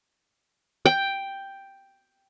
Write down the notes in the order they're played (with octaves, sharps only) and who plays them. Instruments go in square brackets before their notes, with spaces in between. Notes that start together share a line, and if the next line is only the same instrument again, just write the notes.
[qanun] G5